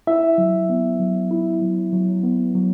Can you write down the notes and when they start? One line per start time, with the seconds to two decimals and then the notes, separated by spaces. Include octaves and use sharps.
0.07 E4 E5
0.38 F#3
0.69 B3
1.00 F#3
1.31 E4
1.62 F#3
1.93 F#3
2.24 B3
2.55 F#3